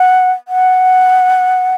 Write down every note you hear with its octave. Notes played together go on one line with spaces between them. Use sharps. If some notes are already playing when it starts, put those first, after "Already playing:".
Already playing: F#5
F#5